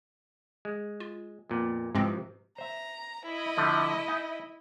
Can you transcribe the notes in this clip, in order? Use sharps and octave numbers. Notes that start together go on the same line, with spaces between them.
G#3
F4
F2 A#2 B3
G#2 C3 E3 F3 G#3 C4
C5 E5 A#5
E4 D#5
D3 F3 A3
D#4 E5 G#5